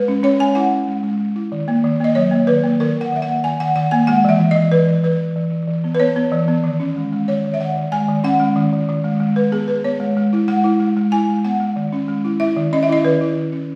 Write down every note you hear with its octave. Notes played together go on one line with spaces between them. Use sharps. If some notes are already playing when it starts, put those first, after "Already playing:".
Already playing: G#3 B4
C#4
C#4 C#5
G#3 G#5
E4 F#5
C#4
G#3
G#3
G#3
E4
D#3
A#3
D#3
A#3 D#5
F#3 C#5
A#3
D#3 B4
A#3
D#3 A#4
D#3 F#5
D#3 E5
F#5
A#3
D#3 G#5
D#3 F#5
D#3 F#5
A#3 G#5
G#3 F#5
E3 E5
E3
E3 D#5
E3 B4
E3
E3 B4
E3
E3
E3
E3
B3
B4
B3 C#5
B3
E3
B3
D#3
C#4
G#3
G#3
D#3 C#5
D#3
E5
D#3 F#5
D#3
G#3 G#5
D#3
C#4 F#5
G#3
D#3
D#3
D#3
G#3
G#3
G#3 B4
B3 G#4
B3 B4
B3 C#5
G#3
G#3
E4
G#3 F#5
E4
G#3
G#3
E4 G#5
G#3
B3 F#5
G#3
D#3
C#4
G#3
E4
E4 E5
D#3
C#4 D#5
E5
E4 D#5
D#3 B4
E4
D#3
C#4